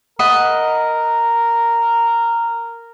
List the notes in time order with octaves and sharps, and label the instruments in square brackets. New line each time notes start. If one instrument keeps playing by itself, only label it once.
[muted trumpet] A#4 [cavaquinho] D#5 F#5 B5